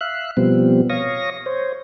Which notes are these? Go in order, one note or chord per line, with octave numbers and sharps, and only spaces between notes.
E5 F5 F#6
B2 F3 G3 B3 C4
C#5 F5 C#6 D#6 A#6
C5 C#5